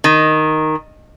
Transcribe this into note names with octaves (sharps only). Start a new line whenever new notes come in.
D#3